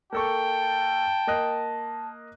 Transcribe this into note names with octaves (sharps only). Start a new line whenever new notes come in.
A#3 A4 G5 A5 C#6
A#3 D#5 F#6